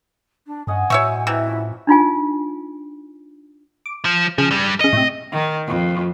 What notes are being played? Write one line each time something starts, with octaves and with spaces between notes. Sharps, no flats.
D4
G2 C#4 D#5 F#5 G#5
A2 F#3 C5 C#5 E5 C#6
C3 E3 E4
F3 C#4
D4 D#4 F4 G#5
D6
F3
C#3 F3
G2 G3
C#3 D#5 C#7
A2 C3
D#3
F2